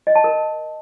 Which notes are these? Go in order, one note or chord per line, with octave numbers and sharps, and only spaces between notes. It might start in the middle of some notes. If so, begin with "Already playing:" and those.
D#5
A5
A#4